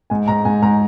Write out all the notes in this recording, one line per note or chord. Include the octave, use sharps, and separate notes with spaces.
G#2 G#5
G#2 A#5
G#2 G#5
G#2 A#5